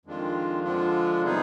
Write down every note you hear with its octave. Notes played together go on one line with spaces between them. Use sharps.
F2 D#3 G#3 D4 F4
D3 F3 G#3 D4 F4
C3 G3 B3 D#4 G#4